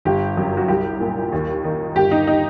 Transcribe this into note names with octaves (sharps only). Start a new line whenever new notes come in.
G1 G4
F#2
F#4
C2 G4
A#2
D#2
D#3
G1 G4
D#4
D#4